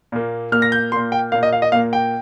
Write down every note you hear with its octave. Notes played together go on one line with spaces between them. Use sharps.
A#2 A#3
A#2 A#3 F6
A#6
G6
A#2 A#3 C6
G5
A#2 A#3 F5
D#5
F5
D#5
A#2 A#3 F5
G5